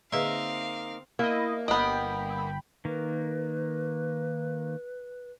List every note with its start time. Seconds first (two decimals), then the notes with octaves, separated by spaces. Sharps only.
0.12 D3 A#3 C4 D#4 G#4 B4 E5 F5
1.19 A#3 E4 D#5
1.68 G1 B3 D#5 G5 B5
2.85 D#3 A#3 B4